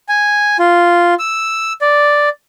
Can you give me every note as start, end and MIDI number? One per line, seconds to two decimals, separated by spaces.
0.09 0.57 80
0.59 1.14 65
1.19 1.73 88
1.81 2.29 74